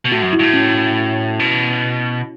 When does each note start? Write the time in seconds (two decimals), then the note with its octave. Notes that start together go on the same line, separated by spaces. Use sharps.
0.05 B2
0.12 A2 F#4
0.22 F#2
0.33 E4
0.39 G2
0.43 A2
0.54 C#4
1.40 B2